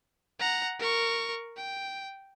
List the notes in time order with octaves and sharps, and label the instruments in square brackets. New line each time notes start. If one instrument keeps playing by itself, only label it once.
[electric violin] F#5 A#5
A#4 C#6
G5